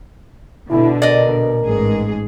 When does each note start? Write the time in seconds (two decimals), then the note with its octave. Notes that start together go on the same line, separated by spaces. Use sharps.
0.70 B2 D3 E4
1.02 A#4 D5 D#5
1.66 A1 G#2 G#4